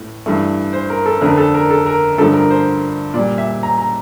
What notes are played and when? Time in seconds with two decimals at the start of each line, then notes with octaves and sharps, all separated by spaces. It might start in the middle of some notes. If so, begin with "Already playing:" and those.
Already playing: A2 E3 A3
0.26 G2 E3 A3
0.73 C5
0.90 A#4
1.06 A4
1.21 F2 D3 A3 A#4
1.38 A4
1.54 A#4
1.70 A4
1.86 A#4
2.18 G2 D3 F3 A3 A4
2.34 A#4
2.50 C5
3.14 A#2 D5
3.18 G3
3.38 E5
3.63 A#5
3.78 A#5